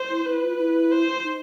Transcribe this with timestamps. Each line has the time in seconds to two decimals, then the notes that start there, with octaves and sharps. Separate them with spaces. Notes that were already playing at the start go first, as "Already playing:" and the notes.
Already playing: C5
0.10 E4
0.25 E4 B4
0.42 F4
0.58 E4
0.92 C5
1.24 D#4